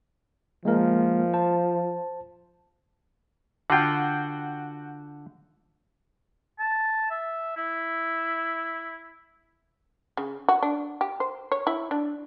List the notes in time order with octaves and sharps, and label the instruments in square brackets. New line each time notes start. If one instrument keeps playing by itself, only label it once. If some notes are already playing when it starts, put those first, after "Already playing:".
[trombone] F3 [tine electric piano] G#3 A#3 A#4
[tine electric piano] C5 A5
[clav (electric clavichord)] D3 F4 [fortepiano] F#4 G5
[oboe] A5
E5
E4
[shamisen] C#3
F#4
D4
G4
C5
C#5
E4
D4